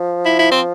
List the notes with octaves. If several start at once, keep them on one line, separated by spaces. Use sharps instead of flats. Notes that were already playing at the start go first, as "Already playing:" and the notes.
Already playing: F3
E4
E4
C4